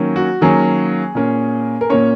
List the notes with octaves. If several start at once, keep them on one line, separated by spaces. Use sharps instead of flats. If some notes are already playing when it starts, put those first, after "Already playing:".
Already playing: D#3 F#3 A#3 C#4
F#4
D#3 F#3 A#3 C#4 G#4
A#2 A#3 C#4
A#4
A#2 A#3 C#4 C#5